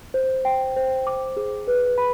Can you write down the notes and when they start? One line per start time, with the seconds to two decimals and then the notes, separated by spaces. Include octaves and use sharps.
0.14 C5
0.45 G5
0.76 C5
1.07 D6
1.37 G#4
1.68 B4
1.98 B5